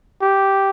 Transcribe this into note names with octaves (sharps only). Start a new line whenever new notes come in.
G4